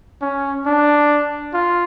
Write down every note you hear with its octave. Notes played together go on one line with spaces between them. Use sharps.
C#4
D4
F4